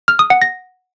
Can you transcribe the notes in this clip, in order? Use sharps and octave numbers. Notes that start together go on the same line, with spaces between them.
F6
D#6
F#5
A#6